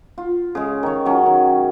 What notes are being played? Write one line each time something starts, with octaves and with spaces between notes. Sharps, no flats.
F4
C#3 G#3
D#3 C#5
F#3 C#4
D#3